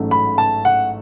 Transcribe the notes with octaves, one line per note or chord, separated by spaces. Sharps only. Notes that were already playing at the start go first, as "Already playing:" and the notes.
Already playing: A1 G#2 F#3 A3 C#4
B5
A5
F#5